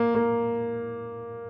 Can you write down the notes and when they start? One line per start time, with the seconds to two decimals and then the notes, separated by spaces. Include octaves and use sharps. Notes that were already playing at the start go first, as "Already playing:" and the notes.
Already playing: A#3
0.15 A#3